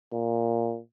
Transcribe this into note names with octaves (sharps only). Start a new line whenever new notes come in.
A#2